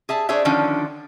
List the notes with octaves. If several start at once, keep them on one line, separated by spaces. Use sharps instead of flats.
G#4 E5 A5
D4 G#4 C5 C#5 E5
D3 D#3 F3 C#4 D4